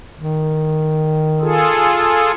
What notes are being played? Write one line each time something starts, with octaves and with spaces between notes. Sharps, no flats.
D#3
F4 G#4 A4